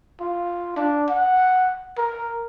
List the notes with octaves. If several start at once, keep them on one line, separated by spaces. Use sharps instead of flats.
F4
D4
F#5
A#4